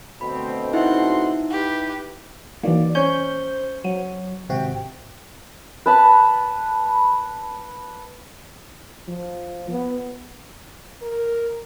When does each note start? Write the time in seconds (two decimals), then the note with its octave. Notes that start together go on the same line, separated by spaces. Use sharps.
0.21 D2 B2 C4 B5
0.73 D#4 E4 E5 F#5 C6
1.50 G4 B4
2.63 D#3 E3 F#3 A#3 D5
2.95 C#4 C5 G6
3.84 F#3 D#7
4.49 G#1 C3 F#4 G5
5.86 B4 A5 B5
9.08 F3
9.70 B3
11.02 A#4